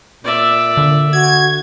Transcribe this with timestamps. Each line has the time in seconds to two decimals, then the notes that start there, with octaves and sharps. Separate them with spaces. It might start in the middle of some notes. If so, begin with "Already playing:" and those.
0.24 A#2 D5 E5
0.77 D3
1.13 F#4 G#6